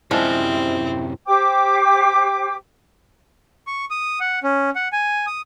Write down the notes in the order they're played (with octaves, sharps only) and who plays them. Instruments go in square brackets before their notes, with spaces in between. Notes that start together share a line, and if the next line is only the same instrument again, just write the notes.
[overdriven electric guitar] F#2 C3 [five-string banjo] F3 G3 G#3 [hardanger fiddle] C4 [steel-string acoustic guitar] E4
[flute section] G4 C5 G5 D6
[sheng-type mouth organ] C#6
D#6
F#5
C#4
F#5
G#5
D#6